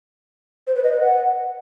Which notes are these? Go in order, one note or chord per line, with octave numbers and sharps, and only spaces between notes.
C5
B4
D#5
B4
F#5